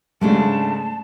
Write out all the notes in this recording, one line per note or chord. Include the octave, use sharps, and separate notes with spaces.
G#2 C#3 G#3 A3 D4 A5